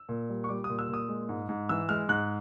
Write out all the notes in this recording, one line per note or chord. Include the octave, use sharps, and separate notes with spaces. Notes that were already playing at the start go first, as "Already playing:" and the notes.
Already playing: E6
A#2
G3
C#6
G3 D6
D#6
A#2
E6
A#2 D#6
G#3
G#2
G#2
E3 E6
G#3 F6
G#2 F#6